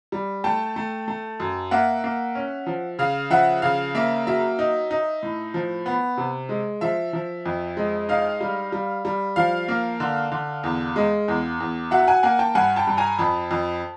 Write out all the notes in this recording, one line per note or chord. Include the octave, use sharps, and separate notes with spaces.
G3
A3 G5 A5
A3
A3
F#2
A#3 E5 F#5
A#3
C#4
F3
C#3 F5
F3 E5 F#5
C#3 F5
A#3 E5
F#3 E5
D#4
D#4
A2
F3
B3
C3
G#3
F3 E5
F3
F2
G#3
D#4 F5
G3
G3
G3
F3 F5
A#3
D3
D3
E2
G#3
E2
E2
F#3 E5 F#5
F#5 G#5
A#3 F#5 G#5
G5 A5
G2 F#5 G#5
G5 A5
G2
G#5 A#5
F2 A5 B5
F2